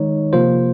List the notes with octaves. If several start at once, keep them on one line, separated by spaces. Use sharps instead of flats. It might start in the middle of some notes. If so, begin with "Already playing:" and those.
Already playing: D#3 G#3 D#4 C#5
C3 F3 A#3 F4 C5